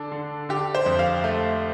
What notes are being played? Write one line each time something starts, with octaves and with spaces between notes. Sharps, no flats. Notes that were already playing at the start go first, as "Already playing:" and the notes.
Already playing: D3 D4 A4 D5
D3
D3 G4
C5
F2
F5
A3